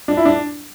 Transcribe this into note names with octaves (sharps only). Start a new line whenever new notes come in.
D4
E4
D4